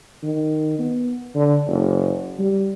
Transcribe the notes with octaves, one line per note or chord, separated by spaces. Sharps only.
D#3
B3
D3
F#1
G3